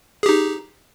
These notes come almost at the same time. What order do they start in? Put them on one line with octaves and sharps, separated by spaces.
G#4 G4 D#4